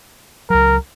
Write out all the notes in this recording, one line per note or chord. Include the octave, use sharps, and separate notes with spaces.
C#2 F#3 A#4